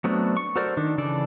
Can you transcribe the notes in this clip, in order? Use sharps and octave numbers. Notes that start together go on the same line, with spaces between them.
F#3 A3 B3 C4 D4
C#6
F#4 A4 A#4 C5 D5
D#3 D4
C#3 E3 D4 A4 D5